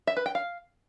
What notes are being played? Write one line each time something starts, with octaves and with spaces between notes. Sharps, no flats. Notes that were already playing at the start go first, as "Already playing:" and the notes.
E5
B4
G5
F5